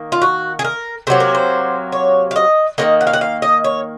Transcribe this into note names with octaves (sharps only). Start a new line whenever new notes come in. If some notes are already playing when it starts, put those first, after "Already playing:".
Already playing: D#3 A#3
F4
F#4
G#4
A#4
C3 F#3 A#3 C5
A#4
C5
C#5
F5
D#5
D#3 F#3 A#3 D#5
F#5
F5
F#5
F5
D#5
C#5